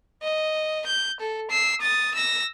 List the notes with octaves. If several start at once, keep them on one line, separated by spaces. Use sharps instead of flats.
D#5
G6
A4
E6 C7
D#6 A6
E6 A#6